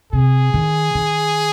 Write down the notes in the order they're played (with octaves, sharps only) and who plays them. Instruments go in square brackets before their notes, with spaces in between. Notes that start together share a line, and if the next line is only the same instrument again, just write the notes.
[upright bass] C3 [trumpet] G#4
[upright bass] D#3
D#3